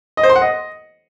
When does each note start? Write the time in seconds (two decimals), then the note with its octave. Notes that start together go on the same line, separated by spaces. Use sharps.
0.17 D#5
0.23 C5
0.30 C6
0.36 F#5
0.42 D#5